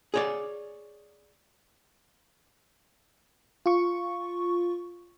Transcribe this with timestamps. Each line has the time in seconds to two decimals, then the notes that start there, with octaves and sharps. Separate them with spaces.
0.14 G#4 C#5 D5
3.66 F4 C#6